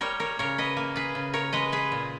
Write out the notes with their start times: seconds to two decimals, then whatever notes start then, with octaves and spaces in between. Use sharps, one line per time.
0.01 G3 A#4 C#5
0.20 A#4 C#5
0.39 C#3 A#4 C#5
0.58 B4 D#5
0.77 A#3
0.96 G#4 B4
1.15 C#3
1.33 A#4 C#5
1.53 G#3 B4 D#5
1.72 G#4 B4
1.92 A#2